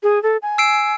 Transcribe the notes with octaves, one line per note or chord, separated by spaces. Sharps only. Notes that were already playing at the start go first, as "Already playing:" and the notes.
G#4
A4
G#5
E6 C7 D7